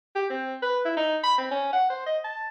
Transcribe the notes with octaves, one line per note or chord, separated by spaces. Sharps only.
G4
C4
B4
E4
D#4
B5
C4
C#4
F#5
C5
D#5
A5